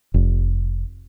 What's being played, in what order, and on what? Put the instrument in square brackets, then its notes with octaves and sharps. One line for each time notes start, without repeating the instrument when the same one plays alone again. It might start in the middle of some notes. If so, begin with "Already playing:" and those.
[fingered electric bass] F1